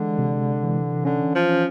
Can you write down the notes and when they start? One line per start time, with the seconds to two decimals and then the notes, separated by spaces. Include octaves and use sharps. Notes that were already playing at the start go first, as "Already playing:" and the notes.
Already playing: D3 E3 G#3
0.18 C3
0.63 E3
1.05 D3 C#4
1.35 F3
1.49 C#4